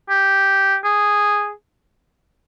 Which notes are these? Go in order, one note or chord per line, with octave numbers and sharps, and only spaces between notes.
G4
G#4